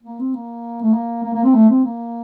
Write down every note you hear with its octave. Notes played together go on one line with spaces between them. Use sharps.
A#3
C4
A#3
A3
A#3
A#3
A#3
C4
A3
C4
A#3